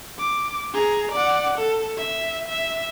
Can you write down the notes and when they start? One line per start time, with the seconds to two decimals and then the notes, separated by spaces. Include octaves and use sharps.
0.19 D6
0.74 G#4 A#5
1.12 D5 F#5
1.58 A4
1.97 E5
2.48 E5